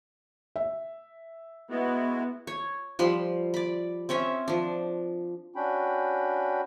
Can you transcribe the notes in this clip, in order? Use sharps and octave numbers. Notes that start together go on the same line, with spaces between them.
E5
G#3 B3 E4 F#4
C#5
F3 G3 B5 C6
D5 B5
C4 C#4 C#5 E5
F3 D4
C#4 D4 F#4 G5 B5